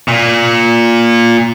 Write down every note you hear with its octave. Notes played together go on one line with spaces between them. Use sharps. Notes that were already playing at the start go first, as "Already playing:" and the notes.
A#2